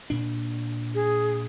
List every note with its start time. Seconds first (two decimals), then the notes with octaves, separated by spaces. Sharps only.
0.10 A#2 D4
0.95 G#4